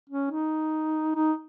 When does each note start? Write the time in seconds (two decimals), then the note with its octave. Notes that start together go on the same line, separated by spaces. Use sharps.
0.10 C#4
0.31 D#4
1.16 D#4